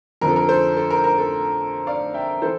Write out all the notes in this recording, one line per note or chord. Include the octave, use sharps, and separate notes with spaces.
F2 D3 F3 A#4
A4
A#4
A4 C5
A4
A#4
A#4
A4
D5 F5
E5 G5
E3 A4 C5